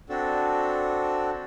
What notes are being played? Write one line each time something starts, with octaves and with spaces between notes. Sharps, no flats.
C4 D4 F#4 A4